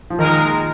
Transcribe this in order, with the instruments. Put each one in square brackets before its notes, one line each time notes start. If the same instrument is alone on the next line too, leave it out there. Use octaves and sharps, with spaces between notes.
[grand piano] F3
[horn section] A#2 G#3 D#4 A#4 [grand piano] D#3